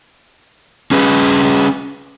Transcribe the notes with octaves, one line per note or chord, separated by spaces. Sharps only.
C#4 G#4 B4